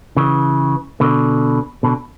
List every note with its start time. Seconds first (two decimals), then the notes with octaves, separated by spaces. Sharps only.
0.17 C#3 E3
1.00 B2 D3
1.83 B2 D3